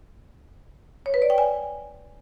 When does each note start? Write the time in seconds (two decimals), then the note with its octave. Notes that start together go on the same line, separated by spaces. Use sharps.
1.06 C#5
1.14 B4
1.22 D5
1.30 G5
1.38 G#5